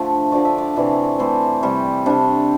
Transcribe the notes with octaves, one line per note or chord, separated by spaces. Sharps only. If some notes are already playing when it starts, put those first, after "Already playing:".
Already playing: D3 F3 A3 E5
D3 F3 A3 D5
E5
D5
C3 E3 A3 D5
C3 E3 A3 C5
C3 G3 G4
C3 G3 D4